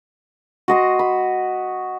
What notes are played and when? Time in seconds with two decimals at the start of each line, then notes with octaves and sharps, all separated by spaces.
0.68 F#4 D#5 C6
0.99 B5